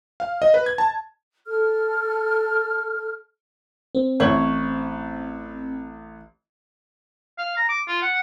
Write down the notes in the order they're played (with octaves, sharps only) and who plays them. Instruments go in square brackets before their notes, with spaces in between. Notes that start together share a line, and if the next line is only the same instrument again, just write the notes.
[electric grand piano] F5
D#5
B4
G#6
A5
[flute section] A4 F6
[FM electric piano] C4
[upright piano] A1 E5 F#7 [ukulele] C#5
[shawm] F5
A#5
D6
F4
F#5